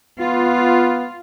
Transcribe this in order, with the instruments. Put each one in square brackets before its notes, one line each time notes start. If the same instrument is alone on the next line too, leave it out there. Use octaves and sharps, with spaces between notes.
[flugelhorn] B3 [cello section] F4